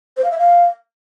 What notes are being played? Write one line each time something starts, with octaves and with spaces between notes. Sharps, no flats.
C5
F5
E5
F5